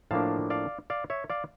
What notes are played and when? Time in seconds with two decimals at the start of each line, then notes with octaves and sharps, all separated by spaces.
0.11 A2 F3 A#3 D4 F5 A5
0.50 D5 F5
0.90 D5 F5
1.10 C#5 E5
1.30 D5 F5